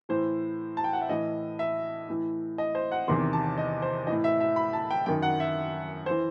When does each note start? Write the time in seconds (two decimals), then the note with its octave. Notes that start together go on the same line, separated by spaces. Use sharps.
0.09 A2 E3 C5
0.77 A5
0.84 G5
0.93 F#5
1.01 E5
1.09 A2 E3 D#5
1.59 E5
2.09 A2 E3
2.58 D#5
2.75 C5
2.92 F#5
3.08 E2 C3 D#3 C6
3.33 A5
3.58 D#5
3.82 C5
4.07 A2 E3 D#5
4.24 E5
4.40 E5
4.56 B5
4.73 A5
4.91 G5
5.06 F#2 D#3 G5
5.22 F#5
5.40 E5
6.06 E3 C5